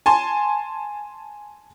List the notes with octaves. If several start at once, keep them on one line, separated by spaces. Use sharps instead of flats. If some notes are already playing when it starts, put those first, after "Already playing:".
G#5 A5 C6